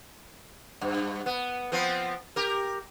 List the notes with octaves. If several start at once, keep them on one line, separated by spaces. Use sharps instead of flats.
G2
B3
F3 B3 C4
G4 A#4